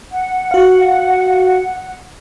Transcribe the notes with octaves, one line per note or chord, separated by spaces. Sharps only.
F#5
F#4 F5